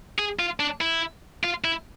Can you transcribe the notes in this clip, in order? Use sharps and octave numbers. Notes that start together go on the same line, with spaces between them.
G#4
F4
D4
E4
F4
E4